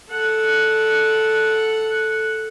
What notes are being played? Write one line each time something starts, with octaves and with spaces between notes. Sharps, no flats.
A4 F#5